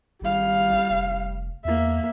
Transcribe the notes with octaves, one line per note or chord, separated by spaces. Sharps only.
G#1 G3 F5
F1
E2 A#3 E5